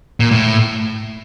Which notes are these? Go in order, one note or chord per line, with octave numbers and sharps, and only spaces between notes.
A#2
A2